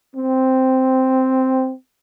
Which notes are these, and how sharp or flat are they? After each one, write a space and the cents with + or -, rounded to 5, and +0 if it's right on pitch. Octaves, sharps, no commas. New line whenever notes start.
C4 -5